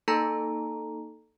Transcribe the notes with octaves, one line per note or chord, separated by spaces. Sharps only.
A#3 D#4 A4 A5 A#5